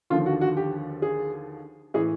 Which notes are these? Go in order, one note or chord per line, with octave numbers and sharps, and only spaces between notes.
D#2 D3 F3 F4
F#4
F#4
G4
G#4
A2 E3 G#4